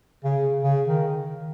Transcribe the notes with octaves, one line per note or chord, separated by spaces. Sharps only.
C#3
C#3
D#3